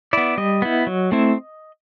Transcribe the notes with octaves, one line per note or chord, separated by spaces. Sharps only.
B3 E4 D5
G3 D#5
B3 E4
F#3
A3 C4 E4